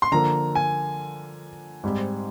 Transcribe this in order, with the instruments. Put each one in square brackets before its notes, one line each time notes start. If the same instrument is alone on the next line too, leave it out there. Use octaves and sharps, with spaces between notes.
[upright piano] C6
[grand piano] D3 F3 A#3 [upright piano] A#5
[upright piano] G#5
[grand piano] G#2 G3 C4